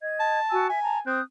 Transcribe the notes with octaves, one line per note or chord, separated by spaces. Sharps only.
D#5 G#6
A5
F#4 G#5 E6
E5 G#5
A5 A#5
C4 D#6 F#6 G6